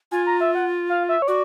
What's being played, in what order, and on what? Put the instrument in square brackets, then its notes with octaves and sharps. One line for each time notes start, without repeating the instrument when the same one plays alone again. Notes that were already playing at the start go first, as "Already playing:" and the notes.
[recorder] F4 [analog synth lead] G#5
[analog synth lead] A#5
E5
F#5
F5
E5
C#5
[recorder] F#4 [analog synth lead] D5